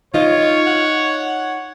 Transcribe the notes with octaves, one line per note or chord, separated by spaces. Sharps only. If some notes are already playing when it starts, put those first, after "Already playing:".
D#4 F4 C#5 D#5
F#5